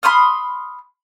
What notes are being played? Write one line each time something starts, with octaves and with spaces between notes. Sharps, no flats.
B5 C6 D#6 F6